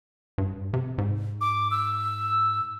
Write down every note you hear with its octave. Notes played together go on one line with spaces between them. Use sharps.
G2
C3
G#2
D6
E6